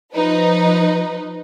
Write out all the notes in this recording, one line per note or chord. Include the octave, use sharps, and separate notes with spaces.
F3 D#4 B4